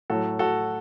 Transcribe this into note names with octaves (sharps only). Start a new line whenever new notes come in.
A2 F#3 F#4 A4
F#4 A4